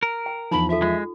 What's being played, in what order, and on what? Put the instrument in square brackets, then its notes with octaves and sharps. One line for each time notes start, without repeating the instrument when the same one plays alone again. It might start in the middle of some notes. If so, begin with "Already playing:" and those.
[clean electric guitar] A#4
[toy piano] G5
[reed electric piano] E2 F3 [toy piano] D#4 [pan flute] B5
[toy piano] F4 A4 [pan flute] E5
[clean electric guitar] G#3 [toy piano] F4